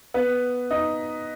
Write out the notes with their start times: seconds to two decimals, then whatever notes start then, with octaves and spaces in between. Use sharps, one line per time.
0.14 B3 B4
0.71 D#4 D#5